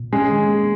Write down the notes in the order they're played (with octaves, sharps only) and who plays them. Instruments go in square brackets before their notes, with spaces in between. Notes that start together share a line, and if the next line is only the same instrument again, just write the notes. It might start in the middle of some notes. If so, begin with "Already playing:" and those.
Already playing: [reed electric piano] A#2
[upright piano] G#3 G#4 [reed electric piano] C#4
[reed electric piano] D#3
A#3